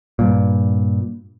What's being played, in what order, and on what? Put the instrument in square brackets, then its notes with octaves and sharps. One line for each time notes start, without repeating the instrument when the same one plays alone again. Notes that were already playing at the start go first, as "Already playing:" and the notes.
[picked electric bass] G2 A#2